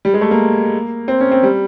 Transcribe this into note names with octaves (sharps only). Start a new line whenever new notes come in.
G3
G#3
A3
A#3
C4
C#4
C4
G3